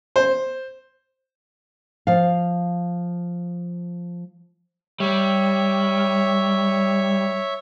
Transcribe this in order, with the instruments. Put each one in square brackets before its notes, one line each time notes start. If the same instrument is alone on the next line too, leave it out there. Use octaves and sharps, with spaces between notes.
[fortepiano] C5
[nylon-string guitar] F3 F5
[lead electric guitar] G3 [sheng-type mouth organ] C#5 E5